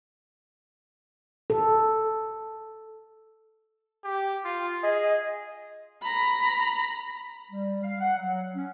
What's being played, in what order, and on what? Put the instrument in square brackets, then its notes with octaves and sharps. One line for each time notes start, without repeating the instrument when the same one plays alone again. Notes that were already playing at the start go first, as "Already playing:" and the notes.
[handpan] A4
[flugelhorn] G4
F4
[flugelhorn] G#4 [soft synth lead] D#5
[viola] A#5 B5
[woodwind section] G3
F5
F#5
F#3
C#4